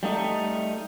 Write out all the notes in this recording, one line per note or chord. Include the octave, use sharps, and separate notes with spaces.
G3 A3 D#4